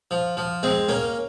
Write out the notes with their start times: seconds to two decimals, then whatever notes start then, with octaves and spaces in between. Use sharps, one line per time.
0.11 F3
0.37 F3
0.63 G#3 C4
0.89 A#3 C#4